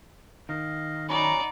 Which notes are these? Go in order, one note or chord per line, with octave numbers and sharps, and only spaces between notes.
D#3 D#5 F5
F#3 C#4 D#4 D5 F#5 A#5 B5